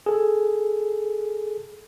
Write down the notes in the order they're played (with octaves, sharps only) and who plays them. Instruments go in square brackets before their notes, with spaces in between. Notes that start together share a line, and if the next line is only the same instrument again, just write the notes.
[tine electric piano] G#4 A4